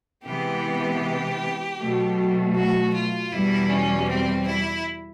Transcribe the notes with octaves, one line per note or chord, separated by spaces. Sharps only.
C3 E3 G#3 B3 G4
B2 F#3 A3
F#4
F4
E2 B2 G3 E4
C#4
C4
E4